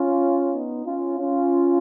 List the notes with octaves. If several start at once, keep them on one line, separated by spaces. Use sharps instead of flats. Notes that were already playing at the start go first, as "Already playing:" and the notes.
Already playing: C#4 F4
B3 D#4
C#4 F4
C#4 F4